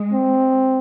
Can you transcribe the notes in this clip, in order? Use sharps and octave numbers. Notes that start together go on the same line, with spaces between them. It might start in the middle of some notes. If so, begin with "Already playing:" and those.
Already playing: G#3
C4